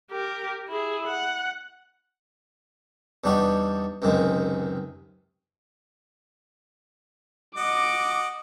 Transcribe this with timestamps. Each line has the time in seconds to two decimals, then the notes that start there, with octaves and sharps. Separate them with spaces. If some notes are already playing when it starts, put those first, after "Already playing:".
0.11 G4 A#4
0.68 E4 G#4
1.07 F#5
3.24 E2 G3 D4 D#4 F#4 G4
4.02 C#2 F#2 C3 D#3 G#3
7.57 F#4 D#5 D6